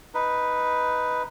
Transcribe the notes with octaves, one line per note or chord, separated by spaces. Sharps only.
D#4 B4